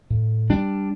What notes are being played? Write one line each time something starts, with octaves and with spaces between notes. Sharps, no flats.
A2
G3 D4